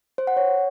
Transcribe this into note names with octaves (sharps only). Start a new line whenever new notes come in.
C5
F#5
C#5